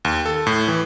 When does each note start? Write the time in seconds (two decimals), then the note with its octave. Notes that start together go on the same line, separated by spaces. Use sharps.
0.05 D#2
0.26 A4
0.47 A2
0.68 E3